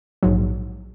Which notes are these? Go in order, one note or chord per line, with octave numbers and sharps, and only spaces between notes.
A#1 G#2 F#3